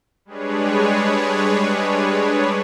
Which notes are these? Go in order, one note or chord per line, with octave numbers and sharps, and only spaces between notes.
G3 G#3 D4 G#4 B4 C#5